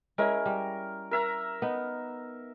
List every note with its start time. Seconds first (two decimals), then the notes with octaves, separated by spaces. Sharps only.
0.18 G#3 C#4 E4 A#4
0.46 G3
1.11 A#4 E5 A#5
1.62 B3 D#4